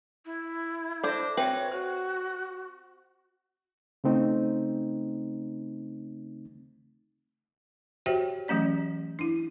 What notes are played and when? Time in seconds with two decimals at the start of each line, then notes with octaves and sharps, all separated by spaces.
0.25 E4
1.04 D4 A4 C5 E5
1.37 C4 F#4 B4 C#5 E5 G5
1.72 F#4 C5
4.04 C#3 A3 C4 D#4
8.06 F#4 G4 C5 C#5 E5 G5
8.48 E3 F#3 A3 C#4 D5
9.19 D4 E4